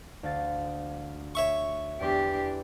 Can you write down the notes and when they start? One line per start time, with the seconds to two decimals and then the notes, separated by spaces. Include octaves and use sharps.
0.23 D2 F5 A6
1.35 C#5 E5 C#6
2.01 E2 D4 G4 C6